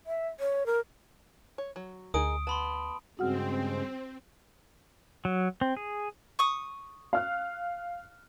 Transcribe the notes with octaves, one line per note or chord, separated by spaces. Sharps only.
E5
C#5
A#4
C#5
F#3
D2 D#4 G#4 A#4 D#6 D7
B3 A5 B5 C6
G2 C#3 G#3 C4 F#4 F#5 F6
F#3
C4
G#4
C#6 D#6
F5 F6 F#6